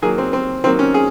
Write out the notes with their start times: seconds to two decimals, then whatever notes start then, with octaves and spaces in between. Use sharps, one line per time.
0.02 D#3 F#3 A#3 G#4
0.18 C4
0.33 C4
0.64 D#3 F#3 A#3 C4
0.79 C#4
0.94 G#4